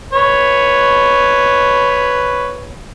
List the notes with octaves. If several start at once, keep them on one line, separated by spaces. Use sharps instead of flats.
B4 C#5